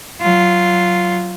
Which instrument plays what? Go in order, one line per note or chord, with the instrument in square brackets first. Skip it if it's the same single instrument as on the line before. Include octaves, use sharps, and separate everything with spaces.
[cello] F#3 F4